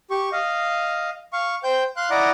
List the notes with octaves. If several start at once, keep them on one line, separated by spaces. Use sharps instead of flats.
G4 C#6
D#5 F5
F5 C#6
C5 G5 G6
F5 C6 F#6
E4 D5 D#5 F#5 A#5 D6